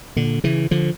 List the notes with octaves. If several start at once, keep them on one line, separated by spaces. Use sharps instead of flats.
A#2 D3
C#3 E3
D3 F3